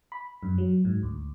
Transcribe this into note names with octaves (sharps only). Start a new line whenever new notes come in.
B5
F#2
F#3
G#2
D2